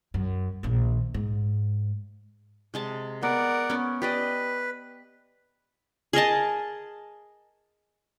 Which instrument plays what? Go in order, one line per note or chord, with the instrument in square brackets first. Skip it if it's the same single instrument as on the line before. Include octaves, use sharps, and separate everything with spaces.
[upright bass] F#2
A#1 D#3
G#2
[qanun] C3 G#3 A5
[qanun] B3 [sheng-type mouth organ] A#4 D5 F#5
[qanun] B3 C#4
[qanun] G4 D5 D#5 [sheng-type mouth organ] B4
[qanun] G#4 A#4 D#5 A5